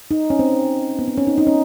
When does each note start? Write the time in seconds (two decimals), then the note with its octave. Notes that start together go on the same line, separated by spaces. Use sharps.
0.11 D#4
0.30 C#4
0.39 C4
0.99 B3
1.08 C4
1.18 C#4
1.27 D#4
1.38 D#4
1.47 C#4